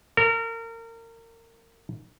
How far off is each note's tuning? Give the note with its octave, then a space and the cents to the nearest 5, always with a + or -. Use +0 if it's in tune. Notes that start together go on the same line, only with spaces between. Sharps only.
A#4 -30